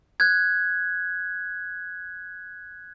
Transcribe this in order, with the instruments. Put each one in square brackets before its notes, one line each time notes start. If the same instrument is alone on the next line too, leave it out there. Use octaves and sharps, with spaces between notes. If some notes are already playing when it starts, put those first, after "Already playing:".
[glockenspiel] F#6 G#6